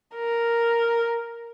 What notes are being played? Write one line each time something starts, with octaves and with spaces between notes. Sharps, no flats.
A#4